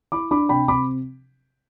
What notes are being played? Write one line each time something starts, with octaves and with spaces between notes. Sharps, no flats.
E4 B5 D6
D4 B5 D6
C3 G5 B5
C3 B5 D6